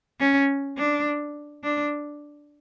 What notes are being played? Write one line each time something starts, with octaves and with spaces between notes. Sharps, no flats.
C#4
D4
D4